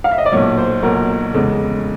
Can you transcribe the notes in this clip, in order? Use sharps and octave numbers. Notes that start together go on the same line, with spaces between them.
F5
E5
D#5
D5
B1 A#2 F#3 C#5
C5
B1 A#2 F#3 A#4
F1 E2 C#3 E3 G#3